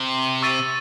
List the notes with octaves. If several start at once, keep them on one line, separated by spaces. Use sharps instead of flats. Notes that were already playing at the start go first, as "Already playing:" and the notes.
Already playing: C3
C#6 E6 A6 D#7